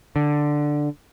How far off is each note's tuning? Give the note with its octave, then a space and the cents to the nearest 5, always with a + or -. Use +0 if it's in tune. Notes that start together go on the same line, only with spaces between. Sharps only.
D3 +5